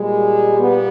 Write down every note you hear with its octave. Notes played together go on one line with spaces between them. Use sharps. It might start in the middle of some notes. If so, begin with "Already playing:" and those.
Already playing: A#2 G3 G#3
B3